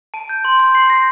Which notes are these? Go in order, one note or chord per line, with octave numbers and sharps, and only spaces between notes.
A5 D7
G6
C6
G6
C6 C7
G6 A#6